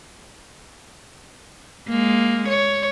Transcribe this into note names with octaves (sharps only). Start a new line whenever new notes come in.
G#3 A#3
C#5